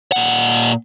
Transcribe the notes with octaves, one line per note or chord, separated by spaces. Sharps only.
A#2 F#5